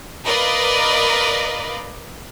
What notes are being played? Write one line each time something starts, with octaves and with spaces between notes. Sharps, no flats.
A#4 B4 D5 D#5 F5